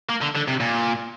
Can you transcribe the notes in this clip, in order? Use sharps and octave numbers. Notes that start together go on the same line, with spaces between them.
A#3
D3
D3
C3
A#2